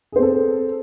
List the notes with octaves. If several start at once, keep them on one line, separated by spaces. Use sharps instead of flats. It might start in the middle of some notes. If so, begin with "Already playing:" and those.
C4 G#4 A4 C5